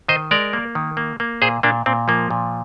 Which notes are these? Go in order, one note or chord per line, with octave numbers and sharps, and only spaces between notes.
D#3 C5 D#5
G#3 A#4 D5
A#3
D#3
A#3
A#3
A#2 G#4 C5
A#2 A#3 D4
A#2 C4
F3 A#3
A#2